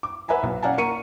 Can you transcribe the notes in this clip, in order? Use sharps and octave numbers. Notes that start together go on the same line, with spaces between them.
D6
B4 E5 F#5 G#5 A#5
B1
C#4 D5 F5 F#5 G#5 A5
A#3 A#4 C#6 C#7 D#7